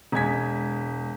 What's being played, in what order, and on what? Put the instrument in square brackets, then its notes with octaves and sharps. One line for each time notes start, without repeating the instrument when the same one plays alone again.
[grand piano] E1 G#3 G#6 B6